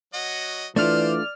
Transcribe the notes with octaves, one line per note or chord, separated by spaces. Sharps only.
F#3 F#4 D#5
E3 A3 D4 F4 C5 D5 F6